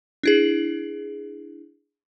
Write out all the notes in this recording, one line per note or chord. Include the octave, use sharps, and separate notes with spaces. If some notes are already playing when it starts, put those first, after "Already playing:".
D4 E4 G#4